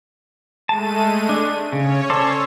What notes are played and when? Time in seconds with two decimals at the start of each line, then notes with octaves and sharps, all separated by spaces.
0.69 G#3 A3 A5 D#7
1.29 D4
1.72 C#3 C#4 C#5
2.10 A4 C5 D5